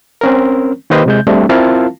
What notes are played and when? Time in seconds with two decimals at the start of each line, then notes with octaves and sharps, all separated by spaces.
0.21 C4 C#4 A#4
0.90 D#3 A#3 G4 B4 C5 D#5
1.06 C3 G#3 G6
1.27 G3 A3 C4 D4
1.49 C4 E4 F4 A#4 F5 A5